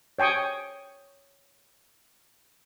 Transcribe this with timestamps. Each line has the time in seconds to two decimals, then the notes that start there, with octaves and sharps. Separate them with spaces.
0.19 C#5 G5 G#5 C#6 D#6